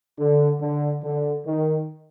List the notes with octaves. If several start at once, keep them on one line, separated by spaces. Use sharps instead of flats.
D3
D3
D3
D#3